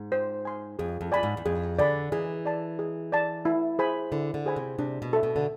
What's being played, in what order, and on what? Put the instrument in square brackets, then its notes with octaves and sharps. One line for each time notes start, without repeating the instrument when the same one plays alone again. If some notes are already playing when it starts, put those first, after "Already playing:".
Already playing: [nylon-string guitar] G#2
[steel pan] C5
G#5 C6
[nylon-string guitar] F2 [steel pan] G#4
[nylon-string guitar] F2
[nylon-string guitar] F2 [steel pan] D5 G#5 B5
[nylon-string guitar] G#2
E2
[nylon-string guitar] F2 [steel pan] G#4
[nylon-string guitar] D3 [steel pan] D5 G#5 B5
[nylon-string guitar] E3 [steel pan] G#4
[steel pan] D5 A5
G#4
D5 A5
E4
G#4 C5 G#5 B5
[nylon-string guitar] D3 [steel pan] E4
[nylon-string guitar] D3
[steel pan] G#4 C5 G#5 B5
[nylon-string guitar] C3
[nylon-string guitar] C3 [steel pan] D4
[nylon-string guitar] B2
[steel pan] A4 E5
[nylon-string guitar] B2
D3